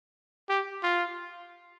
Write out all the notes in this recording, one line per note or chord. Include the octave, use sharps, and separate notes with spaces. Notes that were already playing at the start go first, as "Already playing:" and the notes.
G4
F4